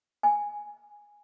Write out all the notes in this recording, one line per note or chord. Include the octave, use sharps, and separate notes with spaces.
G#5